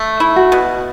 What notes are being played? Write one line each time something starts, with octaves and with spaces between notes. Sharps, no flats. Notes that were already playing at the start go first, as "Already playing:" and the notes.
Already playing: A3
E4
F#4
B2